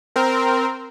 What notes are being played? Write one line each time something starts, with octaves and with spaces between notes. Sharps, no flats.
C4 A#4